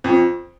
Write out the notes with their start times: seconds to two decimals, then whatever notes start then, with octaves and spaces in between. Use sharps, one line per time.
0.04 F2